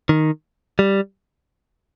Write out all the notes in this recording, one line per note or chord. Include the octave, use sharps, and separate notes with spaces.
D#3
G3